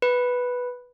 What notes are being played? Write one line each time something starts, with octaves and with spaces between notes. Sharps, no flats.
B4